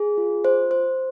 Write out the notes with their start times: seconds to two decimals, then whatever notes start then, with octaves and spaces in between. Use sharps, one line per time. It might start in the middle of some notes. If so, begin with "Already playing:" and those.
Already playing: G#4
0.18 F4
0.45 C5
0.71 C5